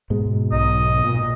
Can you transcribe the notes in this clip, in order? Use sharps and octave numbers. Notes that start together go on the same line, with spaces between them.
G#2 B2 G#3
B1 D#5
A#2